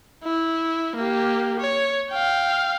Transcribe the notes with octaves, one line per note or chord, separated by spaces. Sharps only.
E4
A#3 G4
C#5
F5 G5